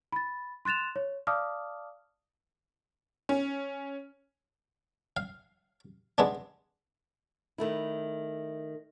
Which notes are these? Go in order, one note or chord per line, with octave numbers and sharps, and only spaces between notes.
B5 A6
C6 F#6 A6 E7 F7
C#5
D5 F5 A5 D6 D#6 F6
C#4
F5
G#3 B3 D4
D#3 A3 E4